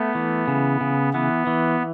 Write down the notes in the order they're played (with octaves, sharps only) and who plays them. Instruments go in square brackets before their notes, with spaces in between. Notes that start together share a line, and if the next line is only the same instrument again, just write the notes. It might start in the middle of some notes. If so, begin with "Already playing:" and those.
Already playing: [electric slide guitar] A3 [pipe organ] B3
[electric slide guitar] E3
C#3
C#3
[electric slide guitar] E3 [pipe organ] B3
[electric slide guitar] E3